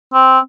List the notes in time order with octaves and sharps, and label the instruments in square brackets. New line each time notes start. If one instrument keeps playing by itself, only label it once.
[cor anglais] C4